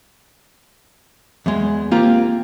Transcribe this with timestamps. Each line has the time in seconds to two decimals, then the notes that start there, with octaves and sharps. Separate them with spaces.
1.46 E2 G#3
1.91 A#3 C4 F4 G4